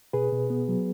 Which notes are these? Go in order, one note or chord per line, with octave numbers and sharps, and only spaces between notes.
B2 G#4 B4
B2
B3
F#3